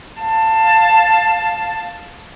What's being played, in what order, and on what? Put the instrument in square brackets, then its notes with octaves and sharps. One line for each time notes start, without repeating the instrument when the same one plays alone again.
[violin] F5 A5